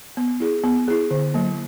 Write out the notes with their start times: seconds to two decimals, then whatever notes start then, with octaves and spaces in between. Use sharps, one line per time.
0.17 B3
0.40 E4 G#4
0.64 B3
0.88 E4 G#4
1.11 D3
1.34 F#3 A#3